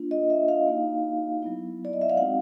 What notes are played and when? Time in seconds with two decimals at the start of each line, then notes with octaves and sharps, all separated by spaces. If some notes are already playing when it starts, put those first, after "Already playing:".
Already playing: A#3 D4 F4
0.11 D#5
0.30 E5
0.48 F5
0.67 A#3 D#4 F#4
1.42 F#3 B3 E4
1.85 D5
1.93 D#5
2.01 E5
2.10 F5
2.17 G#3 C4 D#4 F#4 F#5